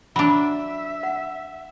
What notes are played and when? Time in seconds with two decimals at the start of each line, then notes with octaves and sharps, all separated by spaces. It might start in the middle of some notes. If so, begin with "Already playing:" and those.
0.16 F#3 D4 E5 B5
1.03 F#5